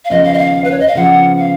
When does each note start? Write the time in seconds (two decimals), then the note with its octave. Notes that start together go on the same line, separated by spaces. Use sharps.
0.05 F5
0.10 D#2 C#3 F3 B3 D#5
0.24 F5
0.34 D#5
0.38 F5
0.64 B4
0.71 C#5
0.80 D#5
0.87 F5
0.95 C#3 F3 B3 F#5
1.38 F5